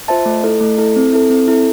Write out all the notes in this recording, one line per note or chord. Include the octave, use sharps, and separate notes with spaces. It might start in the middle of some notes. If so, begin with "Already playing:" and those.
F4 C5 E5 A5
A3
E4 A4
A3
E4 A4
C4
E4 A4
C4
E4 A4